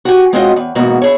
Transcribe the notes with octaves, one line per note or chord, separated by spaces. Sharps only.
F#4 G4 G#5
G#3 C4 C#4 F4 F#4 D#5
E2
E2 G#2 B2 A#3 F#4
E4 G#4 C#5